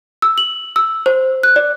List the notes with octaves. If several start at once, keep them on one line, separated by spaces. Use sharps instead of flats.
E6
F#7
E6
C5
F#6
D5